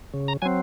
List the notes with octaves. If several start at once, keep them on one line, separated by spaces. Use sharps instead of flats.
C#3
A#5
F#3 C4 G#5